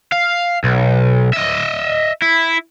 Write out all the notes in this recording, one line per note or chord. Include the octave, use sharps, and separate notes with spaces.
F5
B1
D#5 E5
E4